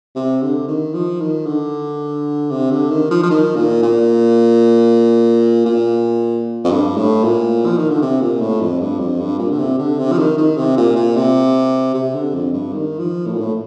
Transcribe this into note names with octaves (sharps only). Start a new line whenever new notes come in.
C3
D3
D#3
F3
D#3
D3
C3
D3
D#3
F3
F3
D#3
A#2
A#2
A#2
F2
G2
A2
A#2
F3
D#3
D3
C3
A#2
A2
F2
G2
F2
G2
A#2
D3
C3
D3
C3
F3
D#3
D#3
C3
A#2
A#2
C3
C3
D3
F2
G2
D#3
F3
A2
A#2
A2